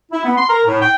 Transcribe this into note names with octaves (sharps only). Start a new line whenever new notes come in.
E4
B3
C6
A#4
A2
G5